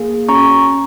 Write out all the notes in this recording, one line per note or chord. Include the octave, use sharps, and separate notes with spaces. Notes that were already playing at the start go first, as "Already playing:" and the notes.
Already playing: A#3 G#4
C#4 F#4 A#5 C#6